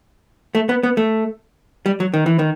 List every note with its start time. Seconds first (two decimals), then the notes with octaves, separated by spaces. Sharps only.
0.55 A3
0.69 B3
0.83 B3
0.97 A3
1.86 G3
2.00 F#3
2.14 D#3
2.26 E3
2.39 D#3